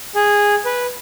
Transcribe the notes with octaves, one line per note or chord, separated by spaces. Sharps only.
G#4
B4